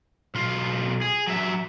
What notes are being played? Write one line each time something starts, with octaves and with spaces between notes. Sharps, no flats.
B1 F4
G#4
F#3 E5